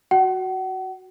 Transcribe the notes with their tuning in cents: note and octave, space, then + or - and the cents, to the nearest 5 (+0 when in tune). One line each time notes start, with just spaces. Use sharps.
F#4 +5 F#5 +35